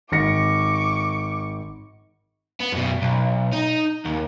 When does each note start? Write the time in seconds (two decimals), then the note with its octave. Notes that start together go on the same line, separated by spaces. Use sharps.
0.12 G#1 C#6 D6 A#6 C#7
2.60 B3
2.72 F#2 B2
3.02 B1
3.52 D#4
4.05 D#2